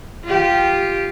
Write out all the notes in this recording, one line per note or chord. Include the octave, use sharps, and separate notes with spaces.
F4 G4